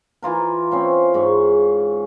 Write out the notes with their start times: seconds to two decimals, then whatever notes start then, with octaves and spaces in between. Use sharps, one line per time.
0.22 E3 F4 A#4
0.71 C4 C#4 F5
1.14 G#2 C#5